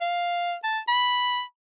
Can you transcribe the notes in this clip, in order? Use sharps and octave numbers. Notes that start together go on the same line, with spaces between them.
F5
A5
B5